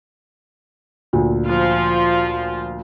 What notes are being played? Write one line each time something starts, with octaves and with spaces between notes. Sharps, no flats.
D2 A#2
F3 F4